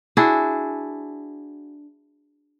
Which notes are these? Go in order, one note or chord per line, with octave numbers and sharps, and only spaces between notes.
D4 E4 F#4 G#4